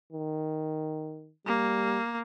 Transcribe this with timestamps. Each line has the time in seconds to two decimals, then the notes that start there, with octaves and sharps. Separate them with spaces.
0.13 D#3
1.46 G3 A#3